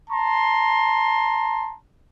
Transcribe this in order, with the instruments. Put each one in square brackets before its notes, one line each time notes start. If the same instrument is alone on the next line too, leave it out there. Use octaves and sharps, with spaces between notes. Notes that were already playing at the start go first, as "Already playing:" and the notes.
[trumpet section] A5 A#5 C6